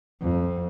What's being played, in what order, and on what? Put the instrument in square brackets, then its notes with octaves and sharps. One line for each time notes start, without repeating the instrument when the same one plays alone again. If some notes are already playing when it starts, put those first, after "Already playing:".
[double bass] F2